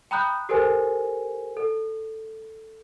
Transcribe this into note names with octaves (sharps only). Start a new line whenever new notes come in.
G5 A#5 B5 D#6 F#6 G6
G4 A4 A#4 C5 G#5
A4